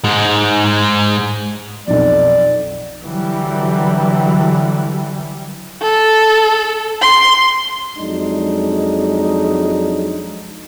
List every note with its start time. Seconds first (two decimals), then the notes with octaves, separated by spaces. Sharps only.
0.04 G#2 G#3
1.87 B1 F2 D5
3.03 D3 E3 F#3 G3
5.81 A4
7.02 C6
7.97 F2 F#3 G#3 D4 D#4